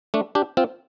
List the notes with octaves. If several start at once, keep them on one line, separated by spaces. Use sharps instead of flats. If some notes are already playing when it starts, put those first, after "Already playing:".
A3 D4
D4 G4
C4 F4